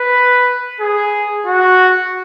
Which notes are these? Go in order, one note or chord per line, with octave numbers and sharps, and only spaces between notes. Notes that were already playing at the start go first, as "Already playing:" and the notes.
Already playing: B4
G#4
F#4